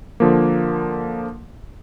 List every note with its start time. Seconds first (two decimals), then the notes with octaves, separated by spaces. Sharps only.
0.20 D3 F3 A#3